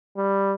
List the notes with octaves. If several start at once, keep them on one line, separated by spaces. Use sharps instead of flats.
G3